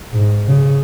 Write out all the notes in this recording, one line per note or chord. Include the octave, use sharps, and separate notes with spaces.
G#2
C#3